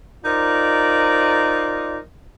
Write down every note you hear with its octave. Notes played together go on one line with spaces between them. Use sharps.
D#4 F4 A#4 C5 D5 D#5